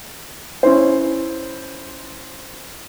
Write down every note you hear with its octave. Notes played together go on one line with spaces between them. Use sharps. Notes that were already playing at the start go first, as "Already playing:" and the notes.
C#4 E4 C5